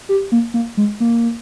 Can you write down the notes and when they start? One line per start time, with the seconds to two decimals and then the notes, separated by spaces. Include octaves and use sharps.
0.09 G4
0.32 A#3
0.54 A#3
0.77 G#3
1.00 A#3